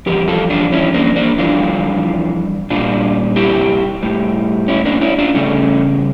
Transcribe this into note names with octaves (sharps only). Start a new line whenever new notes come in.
F2 E3 G3 G4 A#4
F4 A4
D4 F4
C#4 E4
A#3 D4
A#3 D4
F2 E3 G3 D4 F4
A#2 G3 D4 F4
E4 G4
A2 G3
C#4 E4
A#3 D4
C#4 E4
D4 F4
E2 C#3 G3 A3 C#4